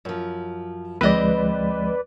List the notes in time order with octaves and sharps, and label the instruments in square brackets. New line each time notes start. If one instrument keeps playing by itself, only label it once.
[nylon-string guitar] F#2 F3
[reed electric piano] D2 F3 G#3 [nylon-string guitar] C4 D#5 [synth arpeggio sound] B4 D5